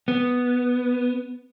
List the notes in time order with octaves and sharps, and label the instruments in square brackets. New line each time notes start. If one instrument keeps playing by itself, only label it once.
[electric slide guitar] B3